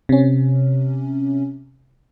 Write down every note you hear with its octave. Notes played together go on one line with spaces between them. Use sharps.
C3 C#4